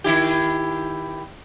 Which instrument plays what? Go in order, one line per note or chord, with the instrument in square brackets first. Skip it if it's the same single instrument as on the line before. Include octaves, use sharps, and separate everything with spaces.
[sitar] D#3 E4 G4